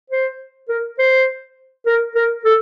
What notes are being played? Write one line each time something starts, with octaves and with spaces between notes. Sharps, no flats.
C5
A#4
C5
A#4
A#4
A4